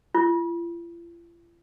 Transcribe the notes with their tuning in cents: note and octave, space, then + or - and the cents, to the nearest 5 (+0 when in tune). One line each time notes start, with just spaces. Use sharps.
F4 -45